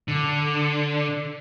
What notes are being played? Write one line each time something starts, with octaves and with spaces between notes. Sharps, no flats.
D3